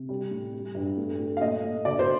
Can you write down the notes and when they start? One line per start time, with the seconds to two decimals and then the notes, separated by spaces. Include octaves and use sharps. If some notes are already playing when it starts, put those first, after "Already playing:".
Already playing: C3
0.09 G3
0.31 A2
0.54 G3
0.75 G2
0.97 A3
1.20 A3
1.37 F5
1.41 A#2 D#5
1.64 A#2
1.85 D3 D5
1.99 C5